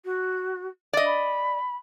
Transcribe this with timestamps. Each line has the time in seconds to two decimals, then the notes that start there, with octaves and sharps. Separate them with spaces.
0.05 F#4
0.93 D5 D#5
1.06 B5